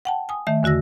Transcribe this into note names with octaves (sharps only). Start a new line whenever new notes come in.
F#5 G5 A5
G#5 D#6
D#3 A3 E5
E2 D3 F#4 E6 A#6